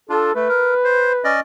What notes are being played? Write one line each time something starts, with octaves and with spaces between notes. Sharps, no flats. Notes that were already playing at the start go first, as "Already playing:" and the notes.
D4 F4 A4
A3 B4
A#4
C5
C#4 D5 D#5